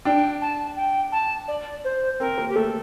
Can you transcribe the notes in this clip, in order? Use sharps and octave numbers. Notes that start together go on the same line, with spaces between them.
D4 G5
A5
G5
A5
D5
C5
C4 A#4
A#3
G4
A3 A4